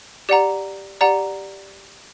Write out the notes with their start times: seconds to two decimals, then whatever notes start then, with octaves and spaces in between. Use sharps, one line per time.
0.29 G4 D5 F#5 A#5
1.01 G4 D5 F#5 A#5